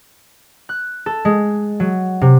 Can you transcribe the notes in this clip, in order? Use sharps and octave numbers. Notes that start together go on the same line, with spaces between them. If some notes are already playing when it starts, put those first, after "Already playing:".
F#6
A4
G#3
F#3
C3